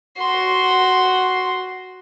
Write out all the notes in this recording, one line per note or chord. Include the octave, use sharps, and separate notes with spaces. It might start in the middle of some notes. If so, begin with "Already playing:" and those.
F#4 C6